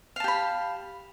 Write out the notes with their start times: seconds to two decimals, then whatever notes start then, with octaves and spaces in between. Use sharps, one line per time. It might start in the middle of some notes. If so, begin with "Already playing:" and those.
0.16 F5
0.20 A5
0.24 G4
0.28 B5